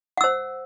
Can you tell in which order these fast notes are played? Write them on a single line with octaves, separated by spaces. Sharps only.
F#5 E6 C5